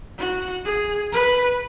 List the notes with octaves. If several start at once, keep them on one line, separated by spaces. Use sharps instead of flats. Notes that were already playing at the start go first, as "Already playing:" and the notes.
F#4
G#4
B4